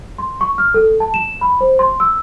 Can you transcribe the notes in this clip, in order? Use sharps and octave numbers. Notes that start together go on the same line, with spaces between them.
C6
C#6
F6
A4
A5
E7
B5
C5
C6
E6